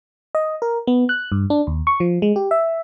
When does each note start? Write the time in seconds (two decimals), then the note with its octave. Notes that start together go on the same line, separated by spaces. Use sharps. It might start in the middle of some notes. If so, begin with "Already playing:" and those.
0.35 D#5
0.62 A#4
0.87 B3
1.09 F#6
1.32 G2
1.50 D4
1.67 D#2
1.87 C#6
2.00 F3
2.22 G#3
2.36 G4
2.51 E5